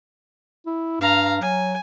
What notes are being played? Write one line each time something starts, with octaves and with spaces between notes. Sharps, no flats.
E4
G2 F5 A#5
F#3 G#5